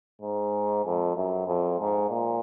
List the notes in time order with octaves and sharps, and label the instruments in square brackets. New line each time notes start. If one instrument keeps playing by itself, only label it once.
[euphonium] G#2
F2
F#2
F2
G#2
A#2